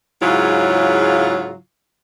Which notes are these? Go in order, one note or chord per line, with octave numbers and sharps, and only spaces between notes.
G#2 C#3 F#3 E4 F4